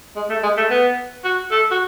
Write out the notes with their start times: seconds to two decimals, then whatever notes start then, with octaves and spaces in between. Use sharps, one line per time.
0.16 G#3
0.30 A3
0.43 G#3
0.57 A3
0.70 B3
1.24 F#4
1.51 A4
1.71 F#4